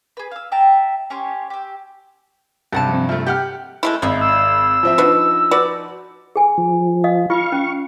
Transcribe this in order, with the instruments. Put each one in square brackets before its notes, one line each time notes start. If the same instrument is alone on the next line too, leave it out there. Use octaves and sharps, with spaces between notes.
[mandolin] G#4 B4
F5 E6
E5 G5 A5 A#5
C#4 G4 C#5 C6
G4 E6
[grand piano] G2 C3 [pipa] A4 F#5 A5
[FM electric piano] F3 C4
[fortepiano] F3 A3 [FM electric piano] E5
[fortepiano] G4 F#5 F6 [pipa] G5
[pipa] G#3 A3 E4
[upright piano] G#1 [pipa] D#5 E5
[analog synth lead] E6
[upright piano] F3 C4 E5
[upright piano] F3 D#4 [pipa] D4 F#4 B4
[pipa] F#4 B4 D5
[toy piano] G#4 G#5
[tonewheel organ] F3
[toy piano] D#5 F5 D#6
[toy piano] F4 [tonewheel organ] F5 C#6
[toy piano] C#4